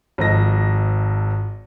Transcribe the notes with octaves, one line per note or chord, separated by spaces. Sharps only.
G#1 G#2 F3 A4 D#5 A#6